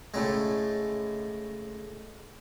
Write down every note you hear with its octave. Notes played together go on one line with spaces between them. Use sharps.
A2 C#3 G#3